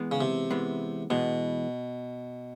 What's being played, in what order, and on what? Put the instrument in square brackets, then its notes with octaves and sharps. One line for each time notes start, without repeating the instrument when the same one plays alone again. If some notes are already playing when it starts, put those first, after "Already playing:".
Already playing: [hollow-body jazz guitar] E3 G#3 B3
[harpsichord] C#3
C3
[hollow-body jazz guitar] E3 G#3 B3
[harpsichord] B2 [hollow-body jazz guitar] E3 G#3 B3